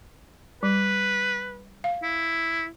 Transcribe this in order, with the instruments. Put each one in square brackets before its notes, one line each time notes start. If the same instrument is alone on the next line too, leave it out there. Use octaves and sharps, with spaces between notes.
[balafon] G3 [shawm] B4
[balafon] F5
[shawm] E4